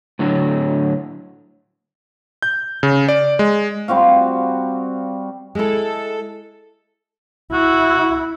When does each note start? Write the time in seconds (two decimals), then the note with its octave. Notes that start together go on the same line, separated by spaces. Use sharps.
0.19 A2 D3 F#3
2.42 G6
2.83 C#3
3.08 D5
3.39 G#3
3.88 G3 C4 F#4 F5
5.55 G#3 E4 A4
7.53 E4 F#4